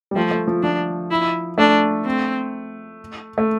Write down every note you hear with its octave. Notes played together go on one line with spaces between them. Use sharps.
G3
F3 A3
A3
F3
F3 D4
E4
A3 D4
C4
A3